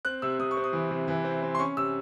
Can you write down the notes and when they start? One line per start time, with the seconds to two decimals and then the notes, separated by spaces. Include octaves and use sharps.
0.05 C4 F#6
0.22 C3 E6
0.39 C3 D#6
0.51 C#6
0.57 C4
0.64 D#6
0.73 E3
0.91 C3
1.08 E3
1.24 C4
1.43 C4
1.55 C6
1.59 C#4 C#6
1.77 C3 E6